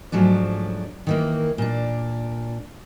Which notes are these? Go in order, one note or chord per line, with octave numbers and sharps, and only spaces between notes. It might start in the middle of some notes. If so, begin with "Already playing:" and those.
G#2 F3 F#3 A3 D4
D#3 E3 A#3
A#2 D4